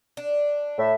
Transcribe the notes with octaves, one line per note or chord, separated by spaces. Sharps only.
D4
A2 E5